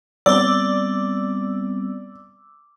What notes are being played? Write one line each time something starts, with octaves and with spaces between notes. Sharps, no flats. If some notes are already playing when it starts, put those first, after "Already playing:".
G3 B3 C4 D5 D6 E6